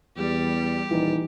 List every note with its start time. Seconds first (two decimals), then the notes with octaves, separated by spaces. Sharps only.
0.17 E2 G3 G4
0.91 D#1 E3 D#4